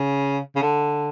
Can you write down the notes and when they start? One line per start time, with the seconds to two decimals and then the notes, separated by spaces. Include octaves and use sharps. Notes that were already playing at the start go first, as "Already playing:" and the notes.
Already playing: C#3
0.56 C#3
0.62 D3